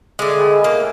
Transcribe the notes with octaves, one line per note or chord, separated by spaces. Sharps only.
D3 G#3 E5
D#3 B3 G#4
E4
A#3
A2 G#5